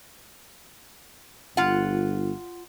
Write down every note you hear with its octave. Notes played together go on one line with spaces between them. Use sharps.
G1 F4 F#5